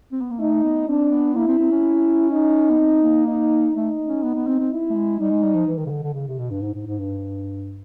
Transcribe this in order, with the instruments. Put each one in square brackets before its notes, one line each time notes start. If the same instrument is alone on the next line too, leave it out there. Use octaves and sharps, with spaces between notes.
[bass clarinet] C4
B3
A#3
[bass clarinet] A3 [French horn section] D#4
[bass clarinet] B3
[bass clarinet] C4 [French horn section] D4
[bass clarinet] B3
[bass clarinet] A#3 [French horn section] E4
[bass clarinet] C4
C4
C#4
[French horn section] D#4
[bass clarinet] B3
C4
A#3
[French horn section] D#4
[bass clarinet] A3 [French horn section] D#4
[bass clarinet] C#4
B3
B3
C4
C4
[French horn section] E4
[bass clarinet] A3
G#3
[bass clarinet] G3 [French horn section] D#4
[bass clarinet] G#3
G3
F3
E3
D#3
C#3
D3
D3
C#3
C3
B2
G2
G#2
G#2
G#2
G2